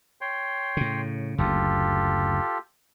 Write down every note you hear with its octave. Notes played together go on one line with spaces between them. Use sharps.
C#5 G5 C6
A2 C#3
F#1 D2 F4 G4 A4